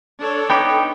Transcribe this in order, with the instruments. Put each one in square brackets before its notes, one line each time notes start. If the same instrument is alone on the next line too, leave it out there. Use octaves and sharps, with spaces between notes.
[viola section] D4 A4 C#5
[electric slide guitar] B3 D#4 G4 [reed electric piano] G5 B5